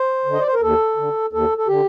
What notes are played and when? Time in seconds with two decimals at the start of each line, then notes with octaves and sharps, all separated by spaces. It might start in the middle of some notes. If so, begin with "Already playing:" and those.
Already playing: C5
0.25 D3
0.33 D#5
0.40 D5
0.47 C5
0.54 A#4
0.61 D#2 A4
0.97 D3
1.33 D#2 A4
1.58 A4
1.68 D3 G4